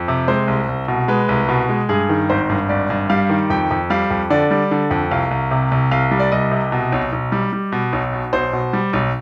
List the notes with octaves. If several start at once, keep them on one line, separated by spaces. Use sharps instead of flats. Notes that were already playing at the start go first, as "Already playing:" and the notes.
Already playing: F2
C3
G#3 C5
C2
C2
B2
G#3 B4
C2
B2
G#3
G2 G#4
D#3
G#1 C5
G2
G#1 D5
G2
G3 F5
D#3
F2 G5
F2
G3 F5
F2
D3 D5
G3
D3
F2
C2 F5
C2
C3
C2
C2 F5
G3
D5
C2 D#5
C3
B2
B1
B1
G3
G3
B2
B1
B2
B1 C5
B2
G3
B1